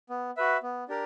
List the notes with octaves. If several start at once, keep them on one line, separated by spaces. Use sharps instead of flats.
B3
F#4 B4 E5
B3
D4 G4 A#4